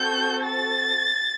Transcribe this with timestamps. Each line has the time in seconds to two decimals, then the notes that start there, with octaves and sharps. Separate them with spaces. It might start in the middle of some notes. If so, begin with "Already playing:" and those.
Already playing: C4 F#4 A4 G6
0.44 A6